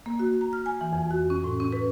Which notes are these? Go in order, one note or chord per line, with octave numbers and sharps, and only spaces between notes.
A#3
F#4
A#5
F6
G#5
E3
F2
F#4
C#4
A2
C#4
B4